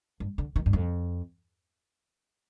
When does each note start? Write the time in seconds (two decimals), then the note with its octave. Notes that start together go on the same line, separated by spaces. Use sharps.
0.20 G2
0.38 D3
0.56 D#3
0.66 G2
0.73 F2